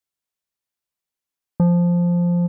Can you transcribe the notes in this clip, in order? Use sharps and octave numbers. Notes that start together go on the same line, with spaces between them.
F3